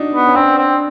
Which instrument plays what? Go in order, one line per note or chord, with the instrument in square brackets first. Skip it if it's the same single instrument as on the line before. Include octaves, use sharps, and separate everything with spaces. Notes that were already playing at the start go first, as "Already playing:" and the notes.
Already playing: [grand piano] D4 D#4 F#4
[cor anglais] B3
[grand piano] C#4
[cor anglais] C4 [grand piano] D4
[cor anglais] C4